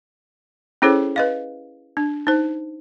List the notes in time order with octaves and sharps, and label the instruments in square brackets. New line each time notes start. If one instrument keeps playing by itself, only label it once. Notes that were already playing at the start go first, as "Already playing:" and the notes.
[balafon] C#4 E4 G#4 A4 C5 C#5
B4 D#5 F5
D4
D#4 C5